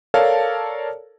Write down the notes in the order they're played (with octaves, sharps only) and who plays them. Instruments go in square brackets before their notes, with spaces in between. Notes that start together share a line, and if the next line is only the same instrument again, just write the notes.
[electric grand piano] A4 A#4 C#5 D5 F5 A5